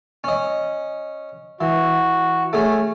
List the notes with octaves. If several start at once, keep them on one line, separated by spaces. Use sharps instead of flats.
C#4 D#5
E3 F#4
A3 C#4 G#4